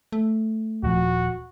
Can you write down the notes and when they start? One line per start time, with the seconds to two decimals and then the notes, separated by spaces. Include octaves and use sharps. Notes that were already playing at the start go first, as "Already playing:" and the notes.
0.12 A3
0.83 D#1 F3 F#4